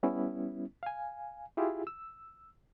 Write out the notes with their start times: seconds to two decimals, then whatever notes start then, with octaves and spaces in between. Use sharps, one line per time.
0.03 G3 B3 C#4 E4
0.83 F5 G#5
1.57 E4 F4 G4 G#4
1.87 E6